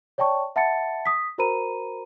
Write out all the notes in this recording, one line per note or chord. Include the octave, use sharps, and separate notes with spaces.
C#5 D5 G5 A5 C#6
E5 F#5 A5 B5 A6 C#7
D#6 B6
F#4 A#4 C5 A#5 B5 D#7